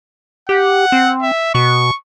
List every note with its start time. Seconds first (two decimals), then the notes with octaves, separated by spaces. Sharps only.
0.49 G4 F#5
0.92 C4
1.22 E5
1.55 B2 C#6